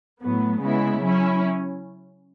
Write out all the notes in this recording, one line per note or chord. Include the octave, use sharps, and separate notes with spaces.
A2 F#3 B3
C#3 G#3 B3 E4
F#3 C#4 E4